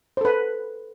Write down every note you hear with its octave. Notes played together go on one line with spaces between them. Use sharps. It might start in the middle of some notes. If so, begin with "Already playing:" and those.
A4 B4 C5